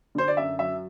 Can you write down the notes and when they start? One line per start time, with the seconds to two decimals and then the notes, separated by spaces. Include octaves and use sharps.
0.15 D3 C5
0.28 D5
0.37 F#2 E5
0.59 F#3 E5